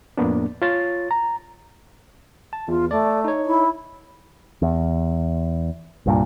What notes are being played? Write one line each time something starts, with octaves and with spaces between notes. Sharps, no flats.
F2 A2 A#3 B3 D4
F4 C#5 A6
A#5
A5
E2 F4
A3 D5
D#4 C#5
E4
E2
C2 G2 A#2